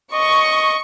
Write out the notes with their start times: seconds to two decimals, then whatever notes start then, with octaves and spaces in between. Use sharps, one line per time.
0.14 D#5 C#6